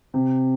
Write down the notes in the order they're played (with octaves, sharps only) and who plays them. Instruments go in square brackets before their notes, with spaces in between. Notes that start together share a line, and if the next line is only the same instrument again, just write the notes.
[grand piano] C3